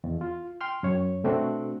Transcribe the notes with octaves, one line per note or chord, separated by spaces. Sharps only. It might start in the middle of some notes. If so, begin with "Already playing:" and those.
E2
F4
G5 C6 F6
F#2 C#5
B2 A3 C4 D4 F#4